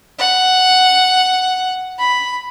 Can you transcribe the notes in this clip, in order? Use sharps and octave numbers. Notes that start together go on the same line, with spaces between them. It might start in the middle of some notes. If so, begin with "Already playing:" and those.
F#5
B5